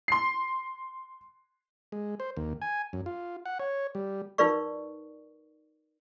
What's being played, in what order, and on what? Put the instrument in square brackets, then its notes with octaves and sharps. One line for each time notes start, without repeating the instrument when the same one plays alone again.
[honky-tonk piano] C6 C7
[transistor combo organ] G#3
C5
D#2
G#5
F#2
F4
F#5
C#5
G3
[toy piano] D#4 F4 A#4 B4 D5 C#6